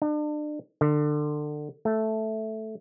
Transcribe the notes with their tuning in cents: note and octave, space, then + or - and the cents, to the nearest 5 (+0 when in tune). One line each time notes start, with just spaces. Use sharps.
D4 +40
D3 +25
A3 -5